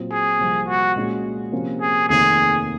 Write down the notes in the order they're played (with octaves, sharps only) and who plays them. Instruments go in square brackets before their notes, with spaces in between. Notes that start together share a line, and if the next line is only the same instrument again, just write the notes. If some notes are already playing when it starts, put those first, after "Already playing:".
Already playing: [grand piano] A#2 F#3 C4 F4
[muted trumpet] G#4
[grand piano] C2 C3 F3 A#3
[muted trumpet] F#4
[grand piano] A#2 G#3 C#4 F#4
C3 F3 A#3 C#4 F4
[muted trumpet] G#4
[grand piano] F1 D#2 D#3 A#3 [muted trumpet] G#4